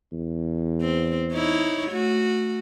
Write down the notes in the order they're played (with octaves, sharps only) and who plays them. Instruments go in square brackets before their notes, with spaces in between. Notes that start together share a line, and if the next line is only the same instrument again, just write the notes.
[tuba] E2
[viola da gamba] C4
D#4 E4 C#5
A3 F#4